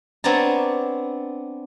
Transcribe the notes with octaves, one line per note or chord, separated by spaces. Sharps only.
B3 C4 D4 C#5 A5 A#5